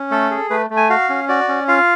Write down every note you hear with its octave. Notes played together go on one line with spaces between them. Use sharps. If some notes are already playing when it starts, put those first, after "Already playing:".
Already playing: C#4
A3 A4
G#4
A3 B4
A3
G#5
F#4 F5
C#4
F#4 D5
C#4
F4 F5